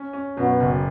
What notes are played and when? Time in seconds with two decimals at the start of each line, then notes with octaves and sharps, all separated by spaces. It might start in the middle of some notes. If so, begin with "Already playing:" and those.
Already playing: C#4
0.13 C#4
0.37 F#2 B2
0.60 F#1